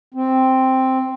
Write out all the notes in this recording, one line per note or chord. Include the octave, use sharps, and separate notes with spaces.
C4